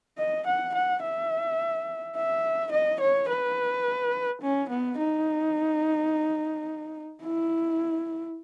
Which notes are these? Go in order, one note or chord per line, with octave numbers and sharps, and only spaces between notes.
D#5
F#5
F#5
E5
E5
D#5
C#5
B4
C#4
B3
D#4
E4